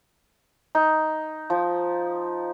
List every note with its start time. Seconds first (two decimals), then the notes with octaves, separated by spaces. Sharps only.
0.75 D#4
1.50 F3